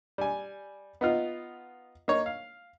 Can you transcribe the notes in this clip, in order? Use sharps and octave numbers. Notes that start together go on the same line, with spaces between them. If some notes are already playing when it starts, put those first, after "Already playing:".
G3 G#5
B3 D#4 F4
A#3 D#4 C#5
F5